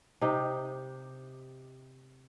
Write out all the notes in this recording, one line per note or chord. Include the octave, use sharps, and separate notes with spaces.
C3 D#4 G4